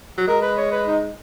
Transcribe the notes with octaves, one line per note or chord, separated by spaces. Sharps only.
F#3
G#3 A#4
B4
C#5
B4
D#4